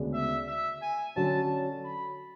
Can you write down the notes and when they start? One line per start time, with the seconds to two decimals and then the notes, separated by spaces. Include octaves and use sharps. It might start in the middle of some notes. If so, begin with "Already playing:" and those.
Already playing: D2 C#3 G#3 B3 D4
0.14 E5
0.48 E5
0.82 G#5
1.16 D3 F#3 C#4 F#4 A5
1.84 B5